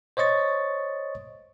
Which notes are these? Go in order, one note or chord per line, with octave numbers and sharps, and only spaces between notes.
C5 C#5 D#5 C#6 A6